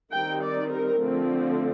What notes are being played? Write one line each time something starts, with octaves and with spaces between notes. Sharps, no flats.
D#3 G3 C4 D#4 G5
D5
A#4
D3 F3 A3 C4